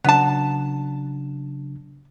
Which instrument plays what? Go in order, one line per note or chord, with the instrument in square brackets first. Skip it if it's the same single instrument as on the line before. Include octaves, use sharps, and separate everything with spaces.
[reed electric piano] C#3 F#3 D4 [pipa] B3 A5